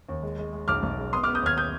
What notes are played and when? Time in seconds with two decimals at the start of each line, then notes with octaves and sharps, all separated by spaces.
0.09 D#2
0.23 G#3
0.38 G#3
0.53 G#3
0.68 B1 D6 F6
0.83 B1
0.98 G#3
1.13 B3 C6 D#6
1.23 D6 F6
1.27 B3
1.35 D#6 G6
1.42 D#2 F6 G#6
1.57 D#6 G6